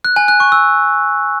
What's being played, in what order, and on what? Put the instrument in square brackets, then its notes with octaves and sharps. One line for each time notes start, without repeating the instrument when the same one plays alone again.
[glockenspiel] F#6
G#5
F#6
C#6
E6